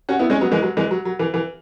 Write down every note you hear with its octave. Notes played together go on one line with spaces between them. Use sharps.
C#4 F#4
B3 E4
G#3 C#4
F#3 B3
E3 G#3
F#3
E3 G#3
F#3
F#3
E3
E3